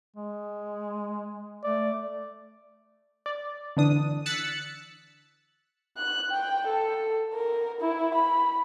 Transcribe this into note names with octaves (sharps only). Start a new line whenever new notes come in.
G#3
A3 D5
D5
D3 E3 D4 D#6
E6 F#6 A6 B6 C#7
F#6
G5
A4
A#4
E4
B5